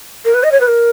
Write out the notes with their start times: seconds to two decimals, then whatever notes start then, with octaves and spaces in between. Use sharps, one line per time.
0.25 A#4
0.34 B4
0.43 D#5
0.52 C#5
0.60 B4
0.68 A#4